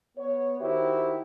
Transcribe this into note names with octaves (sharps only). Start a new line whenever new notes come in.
B3 C#5
D#3 E4 F#4 G4 C5 E5